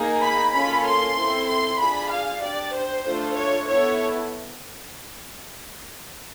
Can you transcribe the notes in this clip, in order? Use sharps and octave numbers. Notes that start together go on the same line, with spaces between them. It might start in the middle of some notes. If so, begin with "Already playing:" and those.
Already playing: A#3 D#4 G#4
B5
A#3 C#4 F4 A4 B5
C6
C4 E4 A4
C6
D4 F4 G#4 B5
F5
D4 G4 D5
C5
A3 D4 F4 A4
C#5
B3 E4 A4 C#5